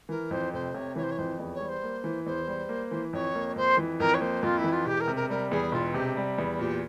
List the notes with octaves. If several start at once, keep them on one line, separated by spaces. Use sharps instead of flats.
E3 A#4
F2 C5
F1 C5
C3 C#5
E3 C#5
C5
C#5
F2 C5
E2
C#5
G3
C5
A#3
E3
E2 C5
G3
A#3
E3
F2 C#5
A#3
F2 C5
E3
F2 A#4
C#5
A#3 C5
F2 F4
E4
E3
F4
E1 G4
A#4
C3
A#4
G3 A#4
E2 G#4
E1 F4
C3 G4
G3
E2
A#2 G4